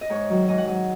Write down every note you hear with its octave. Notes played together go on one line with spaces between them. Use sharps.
D#5
G#2 C#5
D#3 F#3
G#2 D#5
F#5
F#3 D#5